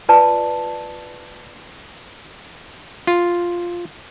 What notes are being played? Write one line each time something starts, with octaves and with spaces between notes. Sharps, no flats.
F4 B4 D5 A5
F4